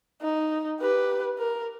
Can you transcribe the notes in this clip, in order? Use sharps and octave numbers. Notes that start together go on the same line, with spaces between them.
D#4
G4 B4
A#4